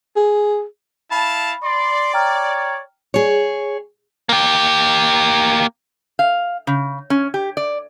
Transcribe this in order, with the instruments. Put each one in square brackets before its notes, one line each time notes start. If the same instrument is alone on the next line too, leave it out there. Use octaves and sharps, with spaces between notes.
[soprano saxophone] G#4
[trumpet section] E4 F5 A5 [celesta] B5
[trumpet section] D5 [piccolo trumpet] C6
[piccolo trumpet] C#5 [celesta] G5 A#5 F6
[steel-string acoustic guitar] G#4 C#5
[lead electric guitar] A#3 G4
[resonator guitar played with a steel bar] F5
C#3
C#4
G4
D5